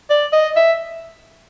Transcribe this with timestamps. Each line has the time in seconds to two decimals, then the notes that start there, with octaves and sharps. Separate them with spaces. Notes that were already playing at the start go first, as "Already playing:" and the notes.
0.09 D5
0.32 D#5
0.56 E5